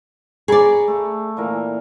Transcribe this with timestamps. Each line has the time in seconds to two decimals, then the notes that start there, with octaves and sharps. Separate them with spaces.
0.48 G#4 D5 A#5 B5 C#6
0.88 A3
1.37 A#2 E3 A#4